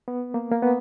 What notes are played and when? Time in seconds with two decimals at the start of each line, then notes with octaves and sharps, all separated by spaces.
0.08 B3
0.34 A#3
0.51 A#3
0.62 B3